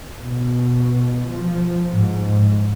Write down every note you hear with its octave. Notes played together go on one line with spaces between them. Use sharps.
B2
F3
G#2